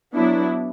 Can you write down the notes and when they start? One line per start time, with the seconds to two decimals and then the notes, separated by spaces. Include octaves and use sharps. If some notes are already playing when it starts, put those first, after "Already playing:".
0.15 F#3 B3 D4 E4